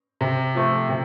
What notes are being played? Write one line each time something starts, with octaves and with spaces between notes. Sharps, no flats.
C3
F3 A3
C3